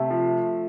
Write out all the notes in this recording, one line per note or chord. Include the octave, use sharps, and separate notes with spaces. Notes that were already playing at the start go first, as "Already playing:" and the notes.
Already playing: C3 A3
F3